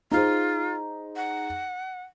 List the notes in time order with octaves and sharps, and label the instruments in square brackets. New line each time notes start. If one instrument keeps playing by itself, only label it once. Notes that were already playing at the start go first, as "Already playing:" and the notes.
[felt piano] D#4 G#4 C5 [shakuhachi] F4
[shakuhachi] F#5